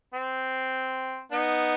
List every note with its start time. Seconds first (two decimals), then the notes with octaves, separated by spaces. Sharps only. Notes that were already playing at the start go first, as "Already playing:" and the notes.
0.14 C4
1.32 B3 D#4